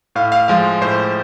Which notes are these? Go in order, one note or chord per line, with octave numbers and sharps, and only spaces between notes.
A2 F5
F5
F3 G#3 F5
A2 C5